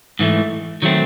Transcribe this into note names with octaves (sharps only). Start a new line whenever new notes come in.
G#2 E3 A3
D#3 F#3 A3 C4